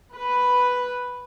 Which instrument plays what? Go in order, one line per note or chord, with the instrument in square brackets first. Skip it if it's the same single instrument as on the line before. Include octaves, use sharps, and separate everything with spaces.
[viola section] B4